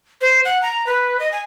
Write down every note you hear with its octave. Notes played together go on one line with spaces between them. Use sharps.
C5
F#5
A#5
B4
D#5
G#5